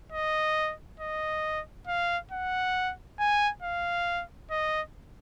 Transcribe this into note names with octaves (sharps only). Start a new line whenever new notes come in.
D#5
D#5
F5
F#5
G#5
F5
D#5